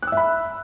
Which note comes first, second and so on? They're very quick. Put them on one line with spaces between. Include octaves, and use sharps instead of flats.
F#6 E6 E5 B5